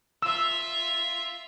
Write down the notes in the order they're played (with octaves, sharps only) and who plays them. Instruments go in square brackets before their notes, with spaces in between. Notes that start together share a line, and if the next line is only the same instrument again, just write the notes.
[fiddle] F4 E5 [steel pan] E6